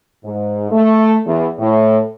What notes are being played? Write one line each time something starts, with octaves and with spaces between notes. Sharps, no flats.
G#2
A3
E2
A2